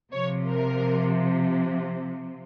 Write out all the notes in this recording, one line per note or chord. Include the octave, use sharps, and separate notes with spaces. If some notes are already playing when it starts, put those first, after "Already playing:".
C3 F3 C#5
A#4